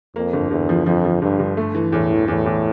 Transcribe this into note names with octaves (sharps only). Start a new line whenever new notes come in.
F2 A#3
G1
G1 E2
F3
F2 F3
F3
G1 G2
G1
A3
E3
E2 A2
E3
E2 A2
E2